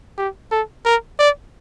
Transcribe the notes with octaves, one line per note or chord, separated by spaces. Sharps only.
G4
A4
A#4
D5